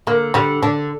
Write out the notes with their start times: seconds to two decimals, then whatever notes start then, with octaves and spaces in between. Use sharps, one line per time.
0.07 D3 A#3
0.34 D3 G3
0.63 D3 D4